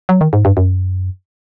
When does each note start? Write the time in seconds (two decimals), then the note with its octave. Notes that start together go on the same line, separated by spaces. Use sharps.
0.09 F#3
0.21 D#3
0.33 G#2
0.45 G2
0.57 F#2